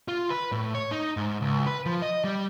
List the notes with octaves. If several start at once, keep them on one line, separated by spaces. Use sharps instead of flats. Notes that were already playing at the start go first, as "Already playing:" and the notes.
F4
B4
A2
C#5
D#4
G#2
C#2
B4
F3
D#5
G3